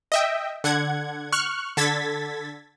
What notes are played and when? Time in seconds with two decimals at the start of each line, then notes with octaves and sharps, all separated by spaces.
0.12 D#5 E5 G5
0.64 D3 F#5 G#6
1.32 C#6 F6 F#6
1.77 D3 A4 G#6 A6 B6